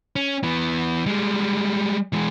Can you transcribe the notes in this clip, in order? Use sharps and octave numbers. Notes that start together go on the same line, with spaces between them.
C#4
E3 B3
G3 G#3
E3 G#3